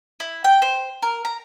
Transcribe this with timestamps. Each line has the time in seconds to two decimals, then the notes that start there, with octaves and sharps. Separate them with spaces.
0.20 E4
0.44 G5
0.62 C5
1.02 A#4
1.25 A#5